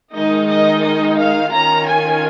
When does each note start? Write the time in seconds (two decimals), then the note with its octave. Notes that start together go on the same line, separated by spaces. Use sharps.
0.14 D#3 G#3 D#4 D#5
0.49 D#5
0.83 D#5
1.18 F5
1.52 D#3 C#4 F4 A#5
1.87 G#5